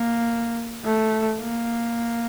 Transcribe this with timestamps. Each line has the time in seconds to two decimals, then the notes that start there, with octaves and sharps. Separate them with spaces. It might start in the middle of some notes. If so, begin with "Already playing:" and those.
Already playing: A#3
0.85 A3
1.41 A#3